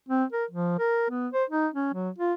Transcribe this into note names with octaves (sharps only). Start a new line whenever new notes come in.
C4
A#4
F3
A#4
B3
C5
D#4
C#4
F#3
F4